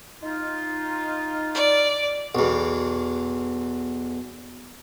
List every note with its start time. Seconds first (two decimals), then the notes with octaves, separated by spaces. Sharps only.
0.23 D#4 F4
1.55 D5
2.35 B1 E2